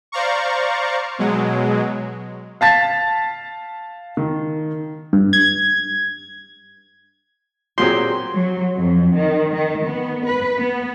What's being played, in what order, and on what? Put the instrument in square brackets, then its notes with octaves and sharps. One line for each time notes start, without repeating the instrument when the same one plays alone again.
[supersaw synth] C5 D5 F5 A#5 C#6
B2 F#3 G#3
[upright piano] F5 A5 A6 B6
D#3
[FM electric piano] G2
G#6
[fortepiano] A#2 F#3 C4 [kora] G4 G#4 [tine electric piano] C6
[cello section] F#3
F2
D#3
D#3
B3
B4
B3